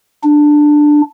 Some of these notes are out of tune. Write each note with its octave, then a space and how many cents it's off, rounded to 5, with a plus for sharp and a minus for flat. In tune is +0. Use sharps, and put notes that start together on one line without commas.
D4 +10